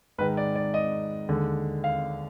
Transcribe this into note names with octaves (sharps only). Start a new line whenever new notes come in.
G#2 D#3 G#3 B4
D5
D5
D#5
D#2 D3 G#3
F5